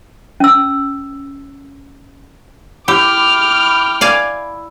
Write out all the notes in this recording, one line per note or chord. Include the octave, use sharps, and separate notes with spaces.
C#4 E6
E4 G4 G5 D6 F6
D5 F5 G#5